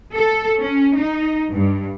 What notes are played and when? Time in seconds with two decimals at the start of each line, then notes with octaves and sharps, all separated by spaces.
0.16 A4
0.61 C#4
0.99 D#4
1.52 G2